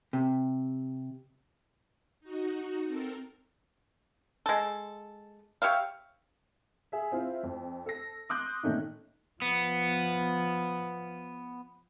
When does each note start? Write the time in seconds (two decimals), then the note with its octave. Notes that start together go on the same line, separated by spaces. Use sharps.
0.13 C3
2.20 D#4 F#4
2.86 C4 A4 A#4
4.46 G#3 A4
5.62 G4 C#5 E5 F5
6.92 G#4 E5
7.12 C4 E4 F4
7.43 F2
7.86 A4 A#6
8.29 C6 D6 D#6 F#6 G6
8.63 A#2 D#3 A3 C#4 D#4
9.42 F3 B3